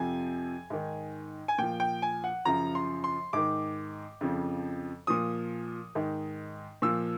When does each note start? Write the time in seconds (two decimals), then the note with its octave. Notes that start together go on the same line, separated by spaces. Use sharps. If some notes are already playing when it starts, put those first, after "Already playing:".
Already playing: F2 C3 F3 G#5
0.70 G#2 D#3
1.48 G#5
1.58 A#2 F3 G5
1.80 G5
2.02 G#5
2.24 F#5
2.45 F#2 C#3 F3 A#5
2.75 C6
3.04 C6
3.33 G#2 D#3 D6
4.21 F2 C#3 F3
5.07 A#2 F3 D#6
5.95 G#2 D#3
6.82 A#2 F3 E6